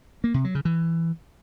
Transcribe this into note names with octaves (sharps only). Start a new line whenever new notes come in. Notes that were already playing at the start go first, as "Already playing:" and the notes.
A#3
C3
F#3
C#3
E3